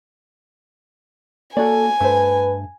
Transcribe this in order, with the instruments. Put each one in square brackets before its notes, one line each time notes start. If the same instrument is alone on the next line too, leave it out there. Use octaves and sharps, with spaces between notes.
[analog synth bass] A#3 [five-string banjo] F#4 C#5 D5 [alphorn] A4 [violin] G#5
[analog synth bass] G2 [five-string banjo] A3 C5 [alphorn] B4